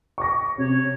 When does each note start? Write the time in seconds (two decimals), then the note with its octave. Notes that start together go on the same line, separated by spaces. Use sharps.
0.18 C#6 D6 A#6
0.58 C3 C#5